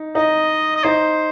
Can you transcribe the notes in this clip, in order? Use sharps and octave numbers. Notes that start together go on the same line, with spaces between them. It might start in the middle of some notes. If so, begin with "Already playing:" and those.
Already playing: D#4
D#4 D#5
D#5
D#4 C5